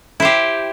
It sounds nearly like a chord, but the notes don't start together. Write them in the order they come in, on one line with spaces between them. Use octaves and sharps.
E4 C5 G4